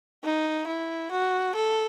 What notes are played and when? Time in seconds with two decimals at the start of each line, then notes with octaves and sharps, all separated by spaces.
0.24 D#4
0.67 E4
1.11 F#4
1.55 A4